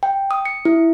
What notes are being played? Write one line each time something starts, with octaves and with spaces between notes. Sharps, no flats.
G5
D#6
C#7
E4